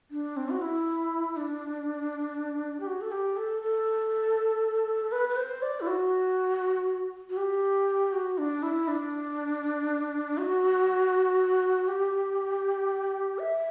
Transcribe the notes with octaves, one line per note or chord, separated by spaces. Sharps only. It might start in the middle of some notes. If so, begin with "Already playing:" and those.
D4
C4
F#4
E4
D4
G4
F#4
A4
G4
A4
A4
B4
B4
C5
D5
E4
F#4
F#4
G4
F#4
D4
E4
D4
F#4
G4
E5